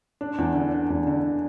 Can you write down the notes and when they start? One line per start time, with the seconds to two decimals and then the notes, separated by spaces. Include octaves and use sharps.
0.21 D4
0.38 E2
0.55 D3
0.72 D4
0.90 E2
1.07 D3